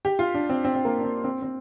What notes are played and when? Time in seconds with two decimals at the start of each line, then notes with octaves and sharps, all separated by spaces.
0.05 G4
0.19 F4
0.34 D4
0.49 C4
0.65 C4
0.75 C4
0.85 A#3
0.99 D4
1.04 C4
1.24 C4
1.42 C4